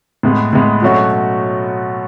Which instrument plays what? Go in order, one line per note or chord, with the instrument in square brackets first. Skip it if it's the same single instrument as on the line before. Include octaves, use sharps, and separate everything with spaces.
[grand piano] A2 G#3 B3
A2 G#3 B3
B2 F#3 A3 C#4 F#4